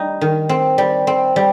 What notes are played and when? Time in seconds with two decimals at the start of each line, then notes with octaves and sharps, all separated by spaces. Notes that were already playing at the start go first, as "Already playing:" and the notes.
Already playing: G3 D#4
0.21 D#3
0.49 C4
0.78 G3
1.07 C4
1.36 G3